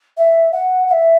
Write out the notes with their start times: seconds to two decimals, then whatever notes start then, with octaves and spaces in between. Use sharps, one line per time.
0.17 E5
0.52 F#5
0.87 F#5
0.91 E5